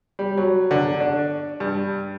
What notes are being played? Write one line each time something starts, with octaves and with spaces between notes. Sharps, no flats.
G3
F#3
D3
D4
G2